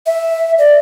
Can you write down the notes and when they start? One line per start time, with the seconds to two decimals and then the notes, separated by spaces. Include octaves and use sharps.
0.06 E5
0.58 D5